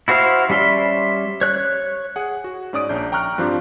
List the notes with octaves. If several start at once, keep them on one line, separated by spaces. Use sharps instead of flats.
E4 F#4 C5 E5 F5
G3 C#4 E5 C6
C#5 F#6
G#4 F#5
F#4
G#2 C#4 D5 D#6 D7
A#1 C#4 D4 G6
G5 A#5 C#6 F6 F#6
G2 F3 C4 D4 F4 G4